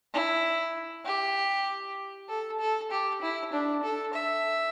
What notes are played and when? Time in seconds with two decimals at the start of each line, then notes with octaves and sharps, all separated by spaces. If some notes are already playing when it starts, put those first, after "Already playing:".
0.14 E4
1.05 G4
2.29 A4
2.60 A4
2.91 G4
3.22 E4
3.53 D4
3.83 A4
4.14 E5